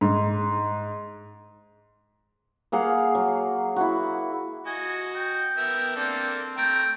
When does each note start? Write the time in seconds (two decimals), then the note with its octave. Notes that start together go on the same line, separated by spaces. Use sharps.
0.01 G#2
2.72 A#3 G#4 F5 F#5
3.15 F#3
3.76 E4 F#4
4.66 F#4 D#5 G#5
5.16 G5
5.57 B3 A#4 E5
5.96 A#3 C4 D4 A4
6.57 A3 G5 A#5